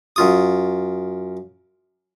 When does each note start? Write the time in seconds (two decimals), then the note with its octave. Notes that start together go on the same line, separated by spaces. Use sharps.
0.16 F#2 F4 D#6